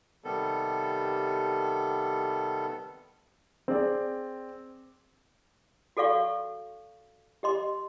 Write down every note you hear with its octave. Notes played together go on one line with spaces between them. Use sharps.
C3 D#3 G3 B3 A4
C4 G#4 D5
F#4 A4 D5 F5 C#6
G4 D#5 C6